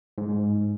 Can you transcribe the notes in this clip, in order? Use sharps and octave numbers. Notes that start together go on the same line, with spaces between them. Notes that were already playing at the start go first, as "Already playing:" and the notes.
G#2